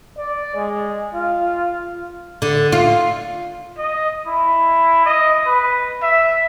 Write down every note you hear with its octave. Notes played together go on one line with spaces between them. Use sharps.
D5
G#3
F4
D3
F4
D#5
E4
D#5
B4
E5